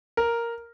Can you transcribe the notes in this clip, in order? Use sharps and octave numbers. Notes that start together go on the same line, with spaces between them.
A#4